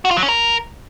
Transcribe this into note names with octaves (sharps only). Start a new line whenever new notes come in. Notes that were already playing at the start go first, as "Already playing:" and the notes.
F#4
F4
F#3
C#4
A#4